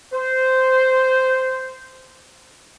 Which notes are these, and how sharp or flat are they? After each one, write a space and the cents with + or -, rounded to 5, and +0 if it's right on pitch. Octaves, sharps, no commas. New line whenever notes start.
C5 -10